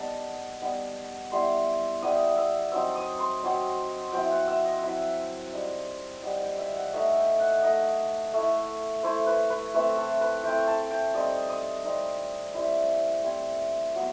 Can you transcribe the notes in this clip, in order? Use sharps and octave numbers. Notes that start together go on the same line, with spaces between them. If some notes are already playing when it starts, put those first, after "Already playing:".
Already playing: G3 B3 D#4 A5
G3 B3 D#4
G3 B3 E4 C6
G3 B3 E4 D#6
E6
F#3 C4 D#4 E6
D#6
C6
F#3 C4 D#4
F#3 C4 E4 G5
F#5
E5
D#5
F#3 C4 E4 E5
G3 D#4
G3 D#4 F#5
G5
E5
F#5
A3 D#4 E5
G5
F#5
A3 D#4 D#5
A3 E4
A3 E4 C5
B4
B4
A3 C4 E4 B4
A4
B4
A3 C4 E4 G5
A5
G5
G3 C4 D#4 D#6
D#6
G3 C4 D#4
G3 C4 E4 B5
G3 C4 E4
F#3 B3